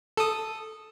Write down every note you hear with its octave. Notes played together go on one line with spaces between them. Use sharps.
A4 D#6